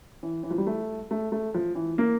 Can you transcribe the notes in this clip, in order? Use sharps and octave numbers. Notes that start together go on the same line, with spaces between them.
E3
E3
F3
G3
A3
A3
A3
F3
E3
A#3